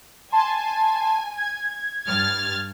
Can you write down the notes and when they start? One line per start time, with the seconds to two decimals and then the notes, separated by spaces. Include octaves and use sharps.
0.32 G#5 A5 C6
1.37 G#6
2.07 G2 F6 A6